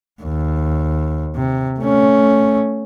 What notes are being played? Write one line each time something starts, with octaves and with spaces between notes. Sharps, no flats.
D#2
C3
A3 C#4